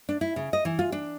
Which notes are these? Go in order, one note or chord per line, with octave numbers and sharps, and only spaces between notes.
D4
E4
C#3
D#5
E3
F4
D4